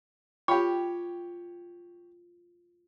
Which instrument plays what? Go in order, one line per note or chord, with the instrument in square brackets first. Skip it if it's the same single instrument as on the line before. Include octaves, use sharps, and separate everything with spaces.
[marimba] F4 G5 B5 [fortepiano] G4 C#5